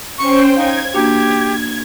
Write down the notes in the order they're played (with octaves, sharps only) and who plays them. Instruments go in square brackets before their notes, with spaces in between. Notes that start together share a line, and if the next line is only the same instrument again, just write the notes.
[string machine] C#4 C5 G5 [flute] C#6
[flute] D#4 [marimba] F5 [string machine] G#6
[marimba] A#3 D4 F#4 [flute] G4